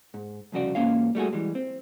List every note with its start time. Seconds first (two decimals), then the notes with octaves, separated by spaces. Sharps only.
0.14 G#2
0.52 C2 F2 C#3 F#4 D5
0.75 E2 G#2 A#3 C#4 F4 F5
1.15 G3 A3 F#4 G#4
1.33 E3 G3 G#3
1.55 C4